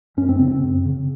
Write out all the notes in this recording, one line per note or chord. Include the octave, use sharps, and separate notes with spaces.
F#2 C#4
C4
C#3 C4
C4
F#2
C#3